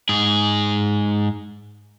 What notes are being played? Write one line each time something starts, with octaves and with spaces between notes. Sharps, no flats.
G#2 G#4